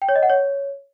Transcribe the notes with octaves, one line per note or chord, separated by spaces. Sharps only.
G5
C#5
D#5
F#5
C#5